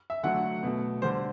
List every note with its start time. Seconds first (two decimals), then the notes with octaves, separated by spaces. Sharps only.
0.10 E5
0.23 D3 F#3 A3 F#5
0.63 B2 A3
1.02 D3 G3 C5